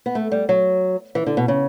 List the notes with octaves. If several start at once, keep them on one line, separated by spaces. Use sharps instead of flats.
B3
A3
G3
F#3
E3
D3
B2
C#3